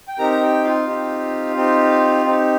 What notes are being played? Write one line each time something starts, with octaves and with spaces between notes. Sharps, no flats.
G5
C4 D#4 G4 A#4 A#5
A#5
G4 G5
F4 F5
C4 D#4 G4
C4 D#4 G4
C4 D#4 G4